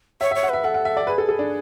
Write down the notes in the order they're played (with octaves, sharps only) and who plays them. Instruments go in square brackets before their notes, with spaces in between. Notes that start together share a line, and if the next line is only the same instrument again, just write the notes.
[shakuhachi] C#5 [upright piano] E5
[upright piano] E5
[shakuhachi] C#5
[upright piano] F#5
[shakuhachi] B4 [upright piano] E5
[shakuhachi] A4 [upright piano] F#5
[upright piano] F#5
E5
D5
[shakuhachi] G#4 [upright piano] B4
[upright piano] A4
A4
D4